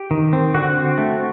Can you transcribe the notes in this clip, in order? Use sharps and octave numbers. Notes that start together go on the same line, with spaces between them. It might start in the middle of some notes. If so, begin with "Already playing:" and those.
Already playing: G4
D#3
C4
D3 F#4
C4
A3